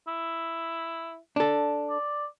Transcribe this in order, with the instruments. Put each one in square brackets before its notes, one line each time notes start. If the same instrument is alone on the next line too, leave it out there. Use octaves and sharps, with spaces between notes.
[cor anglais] E4
[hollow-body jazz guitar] D4 A4
[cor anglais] D5